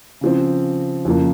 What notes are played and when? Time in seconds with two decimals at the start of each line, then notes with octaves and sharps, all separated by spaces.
0.21 C#3 F3 C4
1.05 F2 C#3 F3 A#3